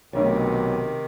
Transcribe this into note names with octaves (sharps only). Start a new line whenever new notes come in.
B1 C3 D#3 A3 D4 C#5